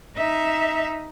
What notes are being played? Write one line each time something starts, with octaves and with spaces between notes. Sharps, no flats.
D#4 E5